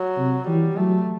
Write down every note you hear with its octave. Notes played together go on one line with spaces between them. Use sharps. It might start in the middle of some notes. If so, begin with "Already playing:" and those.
Already playing: F#3
C3
E3 G3
F#3 A3